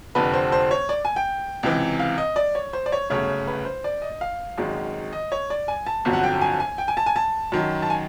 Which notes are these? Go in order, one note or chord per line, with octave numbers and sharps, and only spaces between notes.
F1 F2 D3 B4
C5
C5
C#5
D5
G#5
G5
C#2 C3 E3
F5
D#5
D5
C#5
C5
D5
C#5
G1 F#2 C#3 F#3 A3 C#5
B4
C5
D5
D#5
F5
G#1 F#2 D#3 G#3
D#5
C#5
D5
G#5
A5
G1 F2 D3 F#3
F#5
G5
G#5
G#5
G5
G#5
A5
G#5
A5
F#2 D#3 F#3
A5
G#5